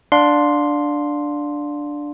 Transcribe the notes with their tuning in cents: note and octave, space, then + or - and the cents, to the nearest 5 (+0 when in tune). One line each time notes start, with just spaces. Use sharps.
D4 +0 F5 +30 C6 +0